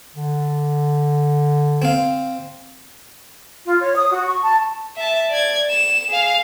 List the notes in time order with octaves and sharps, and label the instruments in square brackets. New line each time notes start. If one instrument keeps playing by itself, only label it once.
[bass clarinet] D3
[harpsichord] C4 F5
[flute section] F4
C#5
D#6
F#4
C#6
A5
[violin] E5 A5
D5 G#6
E7
G#4 F5